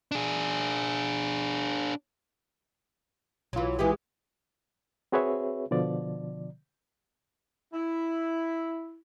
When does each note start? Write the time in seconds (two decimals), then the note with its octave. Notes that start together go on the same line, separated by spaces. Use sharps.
0.12 D4 G#4
3.53 B1 E3 F#3 F4
3.79 E3 G#3 E4 G4
5.12 C4 F#4 G#4 B4 C#5 E5
5.71 B2 D3 F3 D5
7.73 E4